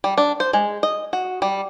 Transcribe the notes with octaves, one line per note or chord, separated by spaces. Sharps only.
G3
D4
C5
G#3
D#5
F#4
G3